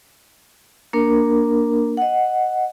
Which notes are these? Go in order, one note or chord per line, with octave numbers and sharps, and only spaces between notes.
A#3 D4 A#4
D#5 F#5